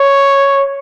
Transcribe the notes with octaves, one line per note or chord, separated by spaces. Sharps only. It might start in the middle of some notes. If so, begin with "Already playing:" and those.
Already playing: C#5